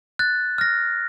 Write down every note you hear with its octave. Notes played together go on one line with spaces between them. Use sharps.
F#6 A6
F6 A#6